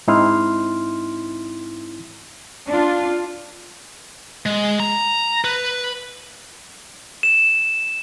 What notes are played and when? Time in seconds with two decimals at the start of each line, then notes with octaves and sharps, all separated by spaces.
0.07 G#2 C4 D#4 E4 C6 F6
2.68 D4 F4
4.46 G#3
4.80 A#5
5.44 B4
7.23 E7